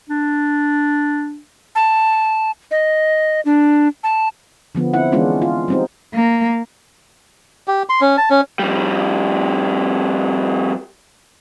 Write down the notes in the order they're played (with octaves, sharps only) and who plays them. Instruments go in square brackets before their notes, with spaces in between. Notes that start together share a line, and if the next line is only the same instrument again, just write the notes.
[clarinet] D4
[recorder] A5
D#5
D4
A5
[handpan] D3 F3 B3
C4 E4 F#5
E3 G#3 B3 C#4 D4 F4
F4
G3 C4 D#4
[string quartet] A#3
[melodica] G4
C6
C#4
A5
C#4
[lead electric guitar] F2 G3